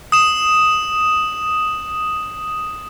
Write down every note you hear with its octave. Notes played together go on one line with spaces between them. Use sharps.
D#6 E7